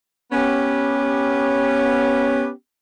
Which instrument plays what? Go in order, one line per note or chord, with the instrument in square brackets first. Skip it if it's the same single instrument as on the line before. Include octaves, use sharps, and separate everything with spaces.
[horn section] B3 C#4 G4